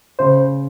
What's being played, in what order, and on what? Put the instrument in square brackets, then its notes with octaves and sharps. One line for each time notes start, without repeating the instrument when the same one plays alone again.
[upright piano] C#3 [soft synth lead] C5